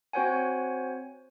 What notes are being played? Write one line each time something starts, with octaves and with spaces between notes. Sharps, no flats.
C4 F#4 C5 C#5 F#5 G#5